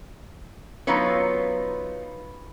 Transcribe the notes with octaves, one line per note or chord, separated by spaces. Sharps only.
F#3 B3 D#4 F4 B4 C#5